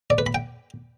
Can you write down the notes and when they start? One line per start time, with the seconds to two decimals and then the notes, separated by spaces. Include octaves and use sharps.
0.10 D5
0.18 B4
0.26 B5
0.35 G5